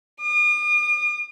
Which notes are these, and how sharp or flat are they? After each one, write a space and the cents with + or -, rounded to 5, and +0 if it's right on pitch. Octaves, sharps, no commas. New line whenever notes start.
D#6 -45